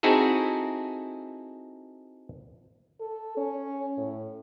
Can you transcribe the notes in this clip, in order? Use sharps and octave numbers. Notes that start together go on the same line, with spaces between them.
C4 D#4 E4 F#4 G#4 A4
A4
C#4
A2